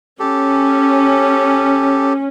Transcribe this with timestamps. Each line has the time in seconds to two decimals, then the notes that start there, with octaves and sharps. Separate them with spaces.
0.20 C#4 G4 A4